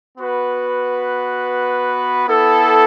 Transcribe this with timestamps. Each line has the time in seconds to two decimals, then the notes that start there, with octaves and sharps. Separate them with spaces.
0.18 B3 F#4 B4
2.27 B3 E4 A4